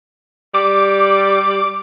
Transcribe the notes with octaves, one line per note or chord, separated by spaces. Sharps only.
G3 D6